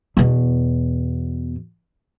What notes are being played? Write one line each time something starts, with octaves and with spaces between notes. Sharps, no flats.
E2 B2